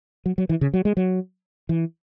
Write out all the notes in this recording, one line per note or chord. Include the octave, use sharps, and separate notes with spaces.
F#3
F#3
E3
C#3
F#3
G#3
F#3
E3